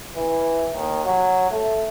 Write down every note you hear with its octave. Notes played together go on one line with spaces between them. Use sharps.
E3
D#2
F#3
A3